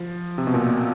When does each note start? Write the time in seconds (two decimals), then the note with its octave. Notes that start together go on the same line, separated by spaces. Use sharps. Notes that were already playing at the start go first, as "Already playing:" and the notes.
Already playing: F3
0.38 C3
0.47 B2
0.54 A#2